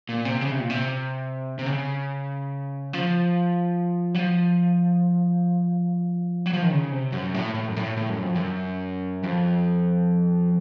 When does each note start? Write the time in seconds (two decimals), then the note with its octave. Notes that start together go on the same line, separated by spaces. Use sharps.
0.09 A#2
0.25 C3
0.41 C#3
0.51 C3
0.60 A#2
0.70 C3
1.59 C3
1.66 C#3
2.93 F3
4.15 F#3
4.19 F3
6.46 F#3
6.53 F3
6.62 D#3
6.71 C#3
6.92 C3
7.12 F#2
7.34 A2
7.55 A2
7.68 F#2
7.76 A2
7.97 A2
8.09 F#2
8.23 F2
8.35 F#2
9.23 F2